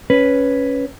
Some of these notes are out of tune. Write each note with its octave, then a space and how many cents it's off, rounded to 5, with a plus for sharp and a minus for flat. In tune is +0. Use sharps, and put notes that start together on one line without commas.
C#4 +0 B4 +0